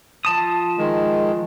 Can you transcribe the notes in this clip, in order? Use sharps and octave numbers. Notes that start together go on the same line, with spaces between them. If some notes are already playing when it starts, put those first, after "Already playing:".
F3 A5 D#6
D#3 G#3